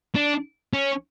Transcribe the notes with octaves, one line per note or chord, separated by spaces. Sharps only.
D4
C#4